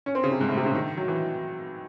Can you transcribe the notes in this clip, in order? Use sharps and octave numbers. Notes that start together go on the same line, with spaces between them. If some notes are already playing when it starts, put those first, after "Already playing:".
C#4
C4
C#3
C3
G#2
A2
C3
C#3
D#3
F#3
E3